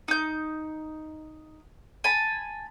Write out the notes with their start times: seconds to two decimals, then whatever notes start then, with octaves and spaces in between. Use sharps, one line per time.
0.08 D#4 G6
2.04 G#5 A5 B5